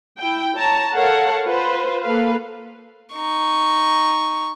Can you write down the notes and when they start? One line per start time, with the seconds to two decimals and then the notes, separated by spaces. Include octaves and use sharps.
0.20 E4 G5
0.56 C#5 A5 A#5
0.94 A4 A#4 C#5 F5 F#5 A5
1.45 F4 B4 C5
2.02 A#3 A4 B4 F5
3.14 D#4 C#6